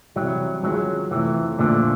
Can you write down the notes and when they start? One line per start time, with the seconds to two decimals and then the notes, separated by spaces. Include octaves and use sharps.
0.16 C3 E3 F#3 G3
0.64 D#3 F#3 G#3 C#4 F4
1.11 F2 C3 E3 F3 A3
1.59 A#2 D3 F3 A3